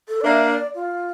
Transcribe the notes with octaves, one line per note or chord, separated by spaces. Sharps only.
A4
D5
A#3 D4 E5
D5
F4